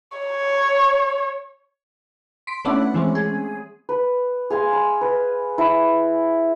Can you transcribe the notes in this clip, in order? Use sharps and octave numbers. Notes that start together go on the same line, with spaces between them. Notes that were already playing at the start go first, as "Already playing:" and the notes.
C#5
C6 B6 D7
A3 B3 C#4 D4 E4 F#5
E3 G#3 C4 C#4
G#4
B4
G#4 F5 G#5 C6
B5
B4
E4 B5